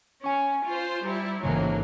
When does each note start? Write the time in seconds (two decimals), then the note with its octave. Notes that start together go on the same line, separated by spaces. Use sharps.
0.24 C#4 G#5 C#6
0.68 F4 C5
1.05 G3 E4 A#5
1.42 A1 G#2 C#3 F#3 A#3